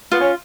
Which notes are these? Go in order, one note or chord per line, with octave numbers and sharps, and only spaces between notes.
B3 F4
C#4